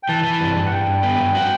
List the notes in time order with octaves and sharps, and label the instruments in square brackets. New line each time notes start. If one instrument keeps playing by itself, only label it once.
[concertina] G5
[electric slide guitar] E3 [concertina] A5
[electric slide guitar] E3
G2
G2
[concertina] F#5
[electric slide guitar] G2 [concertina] G5
[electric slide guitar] G2
B3
G2
F#4